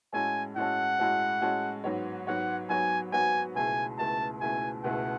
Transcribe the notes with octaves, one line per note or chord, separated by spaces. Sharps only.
A2 G#3 C#4 F#4 A4 G#5
A2 G#3 C#4 F#4 A4 F#5
A2 G#3 C#4 F#4 A4
A2 G#3 C#4 F#4 A4
G#2 F#3 B3 F#4 C#5
G#2 F#3 B3 F#4 C#5 F#5
G#2 F#3 B3 F#4 C#5 G#5
G#2 F#3 B3 F#4 C#5 G#5
C#2 B2 A3 E4 G#4 G#5
C#2 B2 A3 E4 G#4 A5
C#2 B2 A3 E4 G#4 G#5
C#2 B2 A3 E4 G#4 F#5